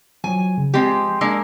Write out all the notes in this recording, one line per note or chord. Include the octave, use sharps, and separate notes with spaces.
F3 F#3 G#5
C#3
F3 G#3 C4 G4
G#3 A#3 D4 E6